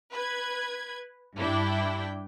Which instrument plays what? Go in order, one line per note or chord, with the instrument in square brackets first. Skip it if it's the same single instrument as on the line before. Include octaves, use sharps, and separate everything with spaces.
[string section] B4 G#6
G2 D4 E4 G5